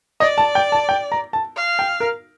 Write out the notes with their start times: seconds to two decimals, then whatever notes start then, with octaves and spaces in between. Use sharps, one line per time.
0.20 D5 D#5
0.38 A5
0.55 G5
0.72 A5
0.89 G5
1.12 A#5
1.33 A5
1.56 F5
1.79 G5
2.00 A#4